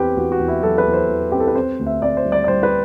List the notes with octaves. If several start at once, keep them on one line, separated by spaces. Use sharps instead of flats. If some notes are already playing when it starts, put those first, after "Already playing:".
Already playing: E2 C4 G4 B4
E2 F#4
F#4
E2
E4
F#3 A4
B4
E2
C5
E2
C4 G4
A4
B4
C4 C5
D2
E5
C4 D5
C5
G3
D5
D5
G3 C5
B4